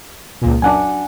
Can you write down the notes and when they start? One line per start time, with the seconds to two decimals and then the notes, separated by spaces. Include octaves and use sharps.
0.42 C#2 A#2
0.62 F#2 D4 F#5 G#5